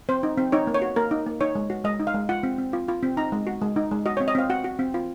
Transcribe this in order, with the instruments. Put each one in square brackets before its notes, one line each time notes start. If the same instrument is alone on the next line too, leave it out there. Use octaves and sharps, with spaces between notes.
[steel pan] C4 C5
D#4
C4
D#4 C#5
A#3
C#5
F#4
A#3 A#4
D#4
A#3
D#4 C#5
G#3
F#4
G#3 D#5
D#4
F5
G#3
F4 F#5
C4
C4
F4
F4
C4
D#4 A#5
G#3
F#4
G#3
D#4
G#3
F#4 D#5
C#5
C4
D#5
C4 F5
F#4 F#5
F#4
C4
F4